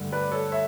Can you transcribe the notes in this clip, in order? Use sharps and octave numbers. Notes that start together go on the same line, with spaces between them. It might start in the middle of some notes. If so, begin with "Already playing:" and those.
Already playing: G2 D3 A3
B4 D5
A4 C#5
C#5 E5